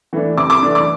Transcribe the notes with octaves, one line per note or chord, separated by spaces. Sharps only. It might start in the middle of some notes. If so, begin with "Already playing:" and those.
E3 A3 D4
C3 D6
D6
E3 A3 D4
D6